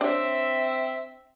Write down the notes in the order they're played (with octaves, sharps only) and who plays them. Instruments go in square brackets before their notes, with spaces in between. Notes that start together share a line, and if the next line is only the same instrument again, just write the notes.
[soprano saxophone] C4 [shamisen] D4 C#5 [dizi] E5